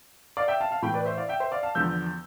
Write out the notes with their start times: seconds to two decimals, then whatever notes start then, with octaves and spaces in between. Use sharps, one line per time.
0.37 D5 F5
0.48 E5 G5
0.61 F5 A5
0.71 F5 A5
0.82 A2 E3 G5 B5
0.94 B4 D5
1.05 C5 E5
1.17 D5 F5
1.29 E5 G5
1.40 C5 E5
1.52 D5 F5
1.63 F5 A5
1.75 E2 D3 F3 E6 G6